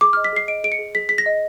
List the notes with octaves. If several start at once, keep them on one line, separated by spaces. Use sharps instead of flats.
G#4 D6
D#5 F6
B6
G#4 C7
D#5 D7
G#4 D7
C#7
G#4
G#4 B6
G#4 B6
A#6
D#5